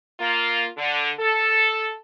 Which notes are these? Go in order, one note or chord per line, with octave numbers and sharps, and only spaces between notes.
A#3 F4
D3
A4